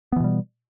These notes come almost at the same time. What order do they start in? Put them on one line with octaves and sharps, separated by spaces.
B3 E3 B2 G3